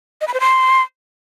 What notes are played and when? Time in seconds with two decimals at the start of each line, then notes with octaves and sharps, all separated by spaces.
0.21 D#5
0.27 B5
0.34 C5
0.40 C6